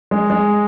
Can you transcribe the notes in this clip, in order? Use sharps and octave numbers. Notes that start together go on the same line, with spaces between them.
G#3
G#3